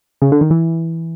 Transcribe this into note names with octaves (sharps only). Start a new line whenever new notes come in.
C#3
D3
D#3
E3